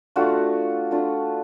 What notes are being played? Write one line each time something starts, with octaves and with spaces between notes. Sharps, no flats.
A3 D4 F4 F#4
A3 D4 F4